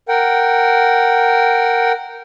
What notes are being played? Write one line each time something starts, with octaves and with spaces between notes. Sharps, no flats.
A#4 F#5 G5